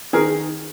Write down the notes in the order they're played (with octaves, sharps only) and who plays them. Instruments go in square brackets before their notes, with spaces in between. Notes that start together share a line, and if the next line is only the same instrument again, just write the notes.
[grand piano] D#3 G#4 A#4